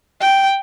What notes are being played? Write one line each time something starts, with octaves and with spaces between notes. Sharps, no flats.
G5